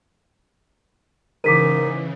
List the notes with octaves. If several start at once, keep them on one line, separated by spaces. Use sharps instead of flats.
G#2 C#3 E3 A#4 D6 B6 D#7